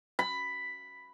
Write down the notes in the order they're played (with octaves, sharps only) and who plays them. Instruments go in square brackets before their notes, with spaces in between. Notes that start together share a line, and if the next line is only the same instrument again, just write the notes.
[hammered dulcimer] B5